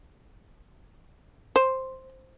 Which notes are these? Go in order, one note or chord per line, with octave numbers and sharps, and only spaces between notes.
C5